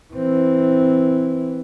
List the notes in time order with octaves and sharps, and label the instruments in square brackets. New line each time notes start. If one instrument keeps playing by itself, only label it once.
[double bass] E3 C4